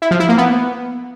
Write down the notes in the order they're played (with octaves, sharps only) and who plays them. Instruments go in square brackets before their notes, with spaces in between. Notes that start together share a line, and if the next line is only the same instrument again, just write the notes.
[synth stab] E4
F3
E4
A#3
B3